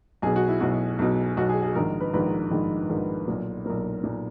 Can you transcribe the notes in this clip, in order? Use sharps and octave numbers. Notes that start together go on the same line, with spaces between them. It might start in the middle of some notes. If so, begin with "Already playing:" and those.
B1 B2 G#4
F#4
E4
B1 B2 F#4
B1 B2
B1 B2 F#4
G#4
G#4
A#1 G#2 D#3 A#4
B4
A#1 G#2 D#3 B4
A#1 G#2 D#3
A#1 G#2 D#3
B1 A#2
B1 A#2 A#4
B1 A#2